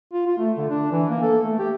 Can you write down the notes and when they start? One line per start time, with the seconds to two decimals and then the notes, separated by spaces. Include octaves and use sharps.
0.13 F4
0.27 F4
0.38 A3
0.57 D3
0.70 D4
0.92 E3
1.09 A#3
1.22 A4
1.43 A3
1.59 G4